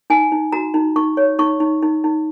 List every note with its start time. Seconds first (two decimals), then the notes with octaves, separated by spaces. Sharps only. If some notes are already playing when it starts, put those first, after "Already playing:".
0.10 D#4 G#5
0.32 D#4
0.52 F#4 A#5
0.74 D#4
0.96 D#4 C#6
1.17 C#5
1.39 D#4 C#6
1.60 D#4
1.82 D#4
2.04 D#4